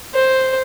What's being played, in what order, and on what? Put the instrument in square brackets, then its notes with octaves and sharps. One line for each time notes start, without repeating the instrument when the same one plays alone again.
[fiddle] C5